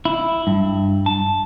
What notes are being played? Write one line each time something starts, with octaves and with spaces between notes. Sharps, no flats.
E4
G2
A5